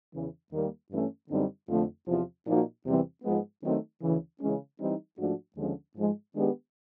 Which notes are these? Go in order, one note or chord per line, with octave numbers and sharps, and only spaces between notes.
E2 C#3 E3
D#2 D#3 G3 A#3
G2 E3 A3 C#4
F#2 D3 G3 C4 D#4
F2 D3 F3 A3
E2 C3 F3
A#2 F3 A#3 D#4 F#4
E2 C3 E3 G3 C4
G#2 F3 G#3 B3
D#3 F#3 A3 C4 D#4
D2 C#3 E3
C#3 E3 G#3 C#4
E3 G3 C4 D#4
G#2 F3 A3 D4 F#4
D#2 D3 F3 G#3 C#4
G#2 F3 G#3
D#3 G#3 B3 D4 G4